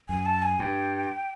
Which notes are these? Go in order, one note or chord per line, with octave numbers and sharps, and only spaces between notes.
F#2 G#5
A5
G#5
G2 G5